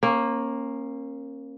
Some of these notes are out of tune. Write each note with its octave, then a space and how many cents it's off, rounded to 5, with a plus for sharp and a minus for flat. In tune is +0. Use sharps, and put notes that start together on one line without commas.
A#3 +0 C#4 -35